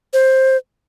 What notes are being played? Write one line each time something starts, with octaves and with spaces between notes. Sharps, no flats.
C5